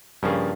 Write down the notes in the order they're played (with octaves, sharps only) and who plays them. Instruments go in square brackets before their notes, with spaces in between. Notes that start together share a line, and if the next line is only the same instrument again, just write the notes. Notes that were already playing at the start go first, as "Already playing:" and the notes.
[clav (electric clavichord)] G2 [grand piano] C#3 F3 A#3 C#4 G#4